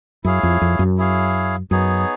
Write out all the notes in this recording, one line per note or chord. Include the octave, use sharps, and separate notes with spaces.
F#2 E4 G#4 C#5 F5
F2
F2
F#2
E4 G#4 C#5 F5
F#2 B3 D#4 G#4 C#5